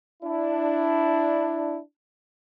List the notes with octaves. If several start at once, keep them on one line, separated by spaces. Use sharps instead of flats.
D4 E4